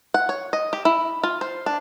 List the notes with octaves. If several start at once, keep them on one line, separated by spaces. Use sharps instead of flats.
F#5
C#5
D#5
G4
E4
F4
C5
D4